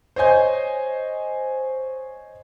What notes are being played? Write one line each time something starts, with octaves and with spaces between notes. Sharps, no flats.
C5 C#5 D#5 G#5 G6